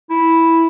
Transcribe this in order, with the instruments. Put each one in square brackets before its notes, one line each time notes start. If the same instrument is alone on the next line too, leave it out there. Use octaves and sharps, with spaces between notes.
[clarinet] E4